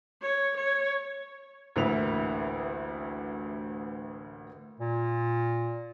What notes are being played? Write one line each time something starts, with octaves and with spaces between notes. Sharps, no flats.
C#5
C#5
A1 D2 A#3 E4 B4 F7
A#2